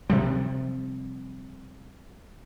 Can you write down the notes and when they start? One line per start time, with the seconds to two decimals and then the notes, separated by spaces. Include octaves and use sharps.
0.10 C3 F3 G3